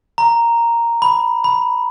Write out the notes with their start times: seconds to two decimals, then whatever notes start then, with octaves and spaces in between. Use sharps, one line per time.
0.18 A#5
1.02 B5
1.44 B5